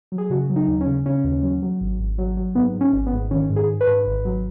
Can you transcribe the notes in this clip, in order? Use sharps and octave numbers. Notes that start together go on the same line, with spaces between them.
F#3
G#4
C#3 F#4
F#3
D#4
D#2
C#4
C#3
C#3 C#4
D#2
F#3
F#3
G#1
G#1
F#3
F#3
G#2 B3
G#2
C#4
G#1
B3
G#2
D#3 C#4
G#2
G#4
G#2
B4
G#2
G#1
F#3